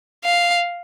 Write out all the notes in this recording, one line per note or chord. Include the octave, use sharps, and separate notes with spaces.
F5